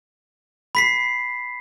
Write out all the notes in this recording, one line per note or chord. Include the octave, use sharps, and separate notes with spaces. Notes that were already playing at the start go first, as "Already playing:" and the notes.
B5 B6 C7